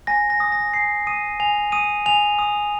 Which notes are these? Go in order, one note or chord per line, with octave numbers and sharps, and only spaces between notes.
G#5 A#6
A#6
D#6
A#6
G#5 C7
D#6 D#7
G#5 F7
D#6 D#7
G#5 F7
D#6